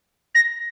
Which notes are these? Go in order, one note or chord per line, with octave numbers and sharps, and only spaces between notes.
A#6